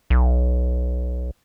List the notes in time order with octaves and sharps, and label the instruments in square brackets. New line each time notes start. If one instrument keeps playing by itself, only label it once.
[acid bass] B1